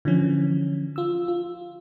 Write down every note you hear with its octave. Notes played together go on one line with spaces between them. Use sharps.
D3 E3 F3 C#4
F4 E6
F4